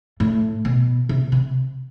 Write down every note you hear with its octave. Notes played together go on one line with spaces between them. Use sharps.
A2
B2
C3
C3